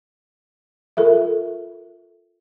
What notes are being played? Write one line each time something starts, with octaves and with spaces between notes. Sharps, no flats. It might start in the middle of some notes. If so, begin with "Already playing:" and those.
F4 A4 A#4 E5